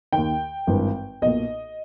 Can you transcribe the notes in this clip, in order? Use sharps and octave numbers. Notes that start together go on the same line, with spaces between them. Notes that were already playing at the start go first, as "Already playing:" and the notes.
D#2 D#3 G5
G#1 G2 E3
B1 A#2 D#5